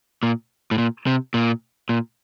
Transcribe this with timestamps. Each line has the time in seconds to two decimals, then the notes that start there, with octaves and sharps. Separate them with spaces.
0.23 A#2
0.71 A2
0.78 A#2
1.07 C3
1.34 A#2
1.89 A#2